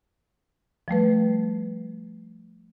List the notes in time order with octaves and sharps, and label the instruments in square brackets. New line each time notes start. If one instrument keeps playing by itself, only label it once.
[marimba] F3 G3 A3 B4